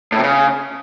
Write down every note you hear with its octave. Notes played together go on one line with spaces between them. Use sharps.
A2
C3
C#3